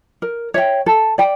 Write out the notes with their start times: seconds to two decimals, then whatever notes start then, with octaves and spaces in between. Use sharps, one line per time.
0.22 A#4
0.54 C#5 E5 G5
0.86 A4
1.18 D5 G5